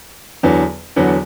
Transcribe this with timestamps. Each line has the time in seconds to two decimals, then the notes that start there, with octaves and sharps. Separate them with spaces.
0.43 E2 D3 F#3 B3
0.96 E2 D3 F#3 B3